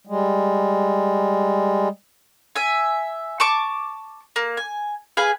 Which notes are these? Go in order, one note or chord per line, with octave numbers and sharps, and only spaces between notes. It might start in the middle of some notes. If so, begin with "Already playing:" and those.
G3 G#3
E5 G#5
A5 C#6 D6
A#3
G#5
G#4 B4 F5 G#5